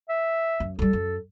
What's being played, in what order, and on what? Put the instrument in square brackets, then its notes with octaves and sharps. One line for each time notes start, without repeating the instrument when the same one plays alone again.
[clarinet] E5
[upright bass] F#2
[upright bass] F#3 G3 [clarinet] A4
[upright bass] F#2